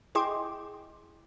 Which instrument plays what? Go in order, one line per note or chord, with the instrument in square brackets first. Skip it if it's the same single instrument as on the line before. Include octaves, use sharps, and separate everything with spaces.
[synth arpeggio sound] E4 G#4 D#5 G5 C6 D6